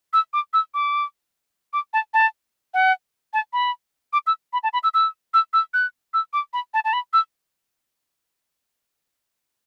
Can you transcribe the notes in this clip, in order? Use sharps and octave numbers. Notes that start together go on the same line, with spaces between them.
E6
D6
E6
D6
D6
A5
A5
F#5
A5
B5
D6
E6
B5
A5
B5
E6
E6
E6
E6
F#6
E6
D6
B5
A5
A5
B5
E6